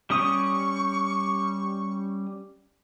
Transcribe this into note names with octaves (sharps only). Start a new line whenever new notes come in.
G3 C#4 C#6 D#6